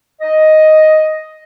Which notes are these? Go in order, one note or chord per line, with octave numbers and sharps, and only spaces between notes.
D#5